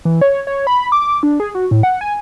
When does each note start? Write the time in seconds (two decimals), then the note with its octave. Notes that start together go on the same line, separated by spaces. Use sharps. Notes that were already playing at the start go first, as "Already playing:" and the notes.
0.05 E3
0.21 C#5
0.47 C#5
0.67 B5
0.92 D6
1.23 D4
1.40 G#4
1.55 F#4
1.71 A2
1.83 F#5
2.01 G#5